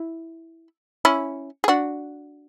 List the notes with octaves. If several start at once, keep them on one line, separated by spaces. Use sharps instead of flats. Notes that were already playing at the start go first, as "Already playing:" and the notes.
Already playing: E4
C#4 E4
G#4
D4 F#4